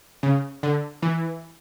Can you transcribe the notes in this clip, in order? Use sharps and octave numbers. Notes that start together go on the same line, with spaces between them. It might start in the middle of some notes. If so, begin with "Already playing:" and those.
C#3
D3
E3